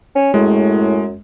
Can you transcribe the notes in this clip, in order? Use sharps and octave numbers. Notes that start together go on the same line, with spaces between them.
C#4
F#2 A2 G#3